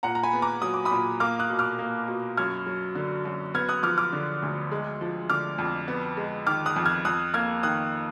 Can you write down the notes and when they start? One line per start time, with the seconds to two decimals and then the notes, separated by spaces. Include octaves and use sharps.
0.03 A#2 F#5 A#5
0.15 A#5
0.23 G#5 B5
0.33 B3
0.42 A#5 D6
0.62 F#3 D#6
0.74 D6
0.85 B5 D#6
0.92 A#2
1.20 A#3 D6 F6
1.39 D#6 F#6
1.50 B2
1.59 D6 F6
1.79 A#3
2.08 B2
2.37 F#2 F6 G#6
2.66 F#3
2.95 D3
3.25 F#2
3.54 B3 F6 G#6
3.69 D#6 F#6
3.83 F3 D6 F6
3.98 D6 F6
4.13 D3
4.42 D2
4.71 G#3
5.01 F3
5.30 D3 D6 F6
5.58 F2
5.88 B3
6.17 G#3
6.46 D#3 D6 F6
6.66 D#6 F#6
6.76 F2
6.85 F6 G#6
7.05 F2 D#6 F#6
7.34 A#3 F6 G#6
7.63 D#3 D#6 F#6